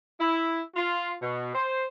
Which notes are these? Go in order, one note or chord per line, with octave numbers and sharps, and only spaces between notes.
E4
F4
B2
C5